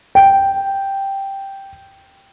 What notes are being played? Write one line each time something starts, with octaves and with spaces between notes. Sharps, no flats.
G5